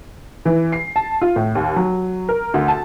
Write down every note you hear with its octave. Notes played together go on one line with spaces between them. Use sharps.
E3
C7
A5
F4
A2
D#2
F#3
A#4
D2
A5